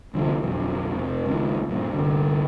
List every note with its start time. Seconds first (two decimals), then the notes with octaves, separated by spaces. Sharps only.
0.14 C2 D3 F3
0.43 B1 F2
0.97 F1 C3
1.26 C#2 D#3
1.69 A#1 G2
1.93 G1 C2 D3